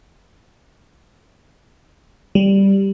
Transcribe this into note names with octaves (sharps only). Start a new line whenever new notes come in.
G3